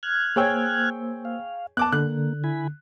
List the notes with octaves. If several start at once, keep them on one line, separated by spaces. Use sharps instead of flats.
F6 F#6 G#6
A#3 G#4 C5 C#5 G5 E6
F5
B3 A5 D6 F#6
D3 A#3 F#6
E4 G#5 B5